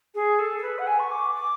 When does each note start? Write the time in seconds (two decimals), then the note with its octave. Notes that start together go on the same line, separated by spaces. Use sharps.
0.14 G#4
0.39 A4
0.58 A4
0.62 B4
0.78 F#5
0.86 G#5
0.99 C#6
1.11 D6
1.35 D6